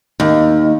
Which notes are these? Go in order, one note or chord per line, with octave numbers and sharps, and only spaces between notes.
D#2